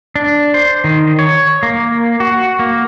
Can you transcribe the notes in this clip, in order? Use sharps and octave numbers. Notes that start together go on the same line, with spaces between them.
D4
C5
D#3
C#5
A#3
F#4
A#3